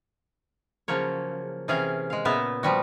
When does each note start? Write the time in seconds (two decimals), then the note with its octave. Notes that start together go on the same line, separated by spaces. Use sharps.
0.88 C#3 F3 F#3 A#3 C#5
1.68 C3 E3 C#4 G#4 F5
2.10 G#3 F5
2.25 A#2 C#3 B3 E5 A#5
2.63 F3 G3 F#4